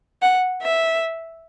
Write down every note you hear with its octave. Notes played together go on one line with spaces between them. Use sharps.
F#5
E5